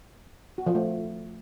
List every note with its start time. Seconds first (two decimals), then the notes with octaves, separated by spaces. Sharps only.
0.58 F#4
0.66 F3
0.75 A3